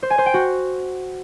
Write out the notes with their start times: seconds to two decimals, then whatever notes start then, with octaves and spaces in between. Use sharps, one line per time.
0.03 C5
0.10 G#5
0.18 C5
0.26 G5
0.34 F#4